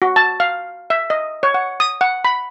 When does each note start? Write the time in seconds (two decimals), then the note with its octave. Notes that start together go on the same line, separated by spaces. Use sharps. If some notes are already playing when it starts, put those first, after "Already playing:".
0.02 F#4
0.16 A5
0.40 F5
0.90 E5
1.10 D#5
1.43 C#5
1.54 F#5
1.80 D#6
2.01 F#5
2.25 B5